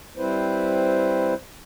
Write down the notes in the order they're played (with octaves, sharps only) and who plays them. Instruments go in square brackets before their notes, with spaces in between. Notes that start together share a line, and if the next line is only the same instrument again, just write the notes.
[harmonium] G3 C4 E4 B4 C5